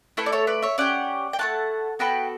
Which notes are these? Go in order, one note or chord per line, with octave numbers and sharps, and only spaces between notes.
A3 E4 A4 B4
D5
A4 C#5
B4 D5
C#5 E5
C#4 G4 D5 F#5
G5
A3 C#4 E4 F#5 A5
B3 F#4 A4 G5 B5